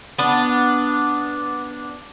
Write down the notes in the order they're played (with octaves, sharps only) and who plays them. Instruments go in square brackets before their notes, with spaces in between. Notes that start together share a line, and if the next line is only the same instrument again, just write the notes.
[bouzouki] B3 D4